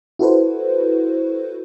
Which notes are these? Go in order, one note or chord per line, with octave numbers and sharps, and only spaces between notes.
E4 F#4 A4 B4 C5